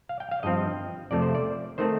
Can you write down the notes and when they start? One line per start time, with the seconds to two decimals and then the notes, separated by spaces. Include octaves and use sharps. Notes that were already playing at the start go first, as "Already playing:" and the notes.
0.09 F5
0.20 G5
0.31 F5
0.43 G2 F3 C4 D#5
1.11 F2 C3 F3 A3 D5
1.22 C5
1.35 D5
1.78 D#3 A3 C4 C5